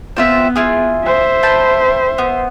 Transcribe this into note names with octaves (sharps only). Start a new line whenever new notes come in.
B3 C4 F4 E5
E4 F4 G#4
C5 E5
B4 G5 A5
B3